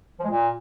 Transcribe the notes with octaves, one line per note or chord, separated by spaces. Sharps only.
F3
G#3
A#2